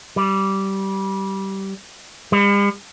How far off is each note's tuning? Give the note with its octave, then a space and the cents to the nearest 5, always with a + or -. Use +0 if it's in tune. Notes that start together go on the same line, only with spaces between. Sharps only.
G3 -15
G3 +45